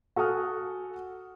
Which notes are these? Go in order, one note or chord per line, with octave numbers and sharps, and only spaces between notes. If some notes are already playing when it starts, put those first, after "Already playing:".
F#4 A4 G#5 D#6 F6